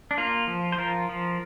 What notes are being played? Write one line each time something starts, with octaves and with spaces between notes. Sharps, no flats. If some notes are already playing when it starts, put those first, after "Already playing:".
D4
A#3 F4
F3
C5
F3 F4 A#4
F3